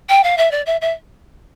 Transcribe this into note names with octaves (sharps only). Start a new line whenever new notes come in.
G5
F5
E5
D5
E5
E5